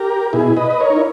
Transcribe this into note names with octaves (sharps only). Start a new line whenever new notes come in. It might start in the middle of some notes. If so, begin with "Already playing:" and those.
Already playing: G4 A#4
B2 E4 G#4
B4 D#5
D#5
A#4 C#5
D#4
E4